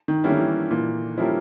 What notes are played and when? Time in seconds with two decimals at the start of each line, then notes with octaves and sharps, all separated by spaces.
0.08 D#3
0.24 D3 G3 A#3 C#4 E4
0.32 D#3
0.40 E3
0.71 A#2 E3
1.18 F3 G3 A#3 C#4 E4